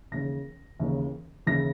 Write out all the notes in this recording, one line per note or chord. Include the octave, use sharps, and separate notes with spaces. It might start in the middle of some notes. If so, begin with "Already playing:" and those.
D#2 C#3 E3 A#6
D#2 C#3 E3
D#2 C#3 E3 A#6